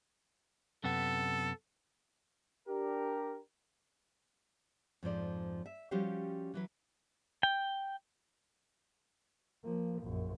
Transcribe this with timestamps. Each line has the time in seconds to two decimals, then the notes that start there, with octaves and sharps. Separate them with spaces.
0.84 F#2 C3 B3 A4
2.68 D4 G4 A#4
5.03 F2 G#2 F3 D5
5.66 E5
5.91 F3 G3 C#4 F#4 G4 F5
6.54 E3 F#3 B4
7.43 G5
9.64 F3 A#3
10.02 A#1 F#2